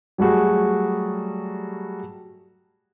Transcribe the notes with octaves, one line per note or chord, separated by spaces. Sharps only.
F#3 G3 A3 F#4 G#4